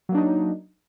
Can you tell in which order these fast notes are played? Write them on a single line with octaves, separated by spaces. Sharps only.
F#3 A#3 D4 D#4